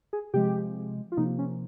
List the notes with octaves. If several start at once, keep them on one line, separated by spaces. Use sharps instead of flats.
G#4
C3 F3 G#3 G4
F4
C3 F3 A#3 D#4
C#4